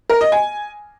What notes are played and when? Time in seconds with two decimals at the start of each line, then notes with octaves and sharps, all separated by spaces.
0.10 A#4
0.21 D#5
0.32 G#5